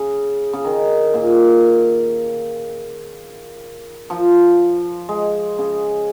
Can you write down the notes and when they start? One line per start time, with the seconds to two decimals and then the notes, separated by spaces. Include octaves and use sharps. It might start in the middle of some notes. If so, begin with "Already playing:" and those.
Already playing: C#3
0.53 C#3
0.64 D#3
1.14 A#2
4.10 F3
5.09 G#3
5.58 C#3